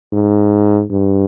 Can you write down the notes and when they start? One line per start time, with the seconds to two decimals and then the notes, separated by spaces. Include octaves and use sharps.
0.13 G#2
0.91 G2